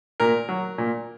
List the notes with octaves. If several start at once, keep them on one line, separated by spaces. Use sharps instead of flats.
A#2 A#4
F#3
A#2